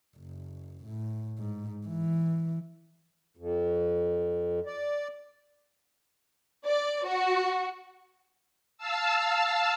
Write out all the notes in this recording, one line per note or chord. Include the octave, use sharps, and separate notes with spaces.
F#1
A2
G#2
E3
F2
D5
D5
F#4
F5 A5 E6